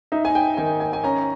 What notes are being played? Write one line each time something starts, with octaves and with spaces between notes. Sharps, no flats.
D#4 E5
G#5
G5
D#3 G#5
G#5
G#5
C#4 A#5